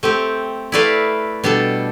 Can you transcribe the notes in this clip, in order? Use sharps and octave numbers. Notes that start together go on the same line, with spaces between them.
A3 C4 G4
A3 E4 B4 D5 F5
B2 G3 D4 A4